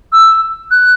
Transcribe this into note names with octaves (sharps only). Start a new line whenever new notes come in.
E6
F#6